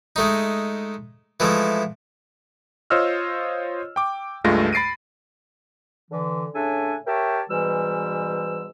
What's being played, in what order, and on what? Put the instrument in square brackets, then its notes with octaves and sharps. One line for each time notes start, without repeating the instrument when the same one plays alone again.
[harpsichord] G#3 A3 D#4
E3 F3 G#3 A3
[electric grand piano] F4 C5 C#5 D#5 E6 F6
G5 D6
C#2 G2 G#3 A3 F4 A#6
B5 A6 C7 D7 D#7
[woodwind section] D3 E3
A2 C#3 D4 A4 E5 G#5
G4 A#4 C#5 E5 G5 A5
G#2 B2 E3 G3 E6